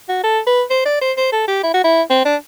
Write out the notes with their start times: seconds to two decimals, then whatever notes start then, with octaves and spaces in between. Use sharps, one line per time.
0.09 F#4
0.24 A4
0.47 B4
0.70 C5
0.86 D5
1.01 C5
1.17 C5
1.32 A4
1.48 G4
1.63 E4
1.74 F#4
1.84 E4
2.10 C4
2.25 D4